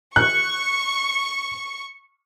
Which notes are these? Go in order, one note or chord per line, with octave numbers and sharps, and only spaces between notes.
C#6 F#6